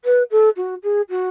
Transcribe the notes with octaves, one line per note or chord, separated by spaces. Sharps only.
B4
A4
F#4
G#4
F#4